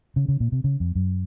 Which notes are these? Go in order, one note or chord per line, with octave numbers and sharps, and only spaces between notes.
C#3
C#3
A#2
C3
C#3
F2
F#2